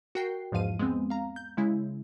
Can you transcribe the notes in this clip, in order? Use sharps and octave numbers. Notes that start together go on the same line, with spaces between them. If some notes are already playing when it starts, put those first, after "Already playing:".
F#4 A#4 G5 C7
E2 G#2 F3 F5 D#7
G#3 B3 C4
F5 A#5
G6
C#3 G#3 E4